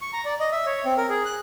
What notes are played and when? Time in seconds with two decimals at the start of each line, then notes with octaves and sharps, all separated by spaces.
0.02 C#6
0.13 A#5
0.25 D5
0.40 D#5
0.52 E5
0.66 C#5
0.85 C4
0.97 A#4
1.09 G#4
1.25 F#6